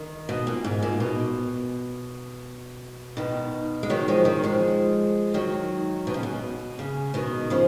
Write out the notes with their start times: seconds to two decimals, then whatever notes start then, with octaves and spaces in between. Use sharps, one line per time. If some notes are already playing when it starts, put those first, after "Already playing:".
Already playing: D#3
0.29 B2
0.47 A#2
0.64 G#2
0.83 A#2
1.00 B2
3.17 B2 D#3
3.83 G#3
3.90 D#3 F#3
4.08 F3 G#3
4.25 D#3 F#3
4.44 F3 G#3
5.34 D#3 F#3
6.07 B2
6.14 C#3
6.23 B2
6.79 C#3
7.14 B2 D#3
7.50 C#3 F3